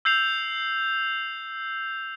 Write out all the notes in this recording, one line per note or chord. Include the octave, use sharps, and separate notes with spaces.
E6 G6 C7 F7